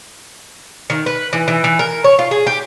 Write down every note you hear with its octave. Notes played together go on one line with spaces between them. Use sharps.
D#3
B4
E3
E3
E3
A#4
C#5
F4
G#4
G4